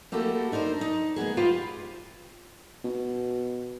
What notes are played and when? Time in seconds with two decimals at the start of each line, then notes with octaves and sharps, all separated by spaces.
0.12 A3 A#3 E4 F#4 G4 A4
0.52 D4 D#4 A#4 C5
0.81 D#4
1.16 G#3 A#3 B3 G#4
1.37 F4 G4 B4 C5 F5
2.84 B2